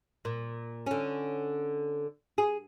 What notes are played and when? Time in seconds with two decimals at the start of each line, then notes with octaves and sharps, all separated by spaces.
0.25 A#2
0.86 D3 C#4
2.38 G#4